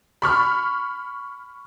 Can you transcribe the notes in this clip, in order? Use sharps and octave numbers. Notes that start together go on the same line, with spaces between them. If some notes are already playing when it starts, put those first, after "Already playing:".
B5 C#6 F6